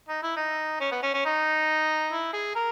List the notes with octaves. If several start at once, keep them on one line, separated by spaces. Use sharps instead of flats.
D#4
E4
D#4
C#4
B3
C#4
C#4
D#4
E4
G#4
A#4